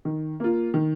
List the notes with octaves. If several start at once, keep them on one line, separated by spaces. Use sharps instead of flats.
D#3
A#3 F4
D#3